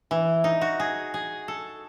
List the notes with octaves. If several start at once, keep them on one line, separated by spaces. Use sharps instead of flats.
E3
D#4
F#4
G#4
G#4
A4